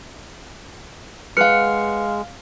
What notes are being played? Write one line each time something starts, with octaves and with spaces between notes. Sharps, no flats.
G#3 B4 F5 F#5 F6 C#7